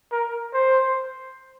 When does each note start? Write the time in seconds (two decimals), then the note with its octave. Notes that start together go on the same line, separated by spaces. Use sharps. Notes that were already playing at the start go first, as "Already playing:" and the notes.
0.12 A#4
0.54 C5